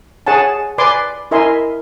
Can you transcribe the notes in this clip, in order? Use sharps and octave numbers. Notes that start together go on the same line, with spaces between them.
G#4 C#5 F#5 G#5 A5
B4 D5 G#5 C6 D6
E4 A#4 D#5 E5 G#5 C6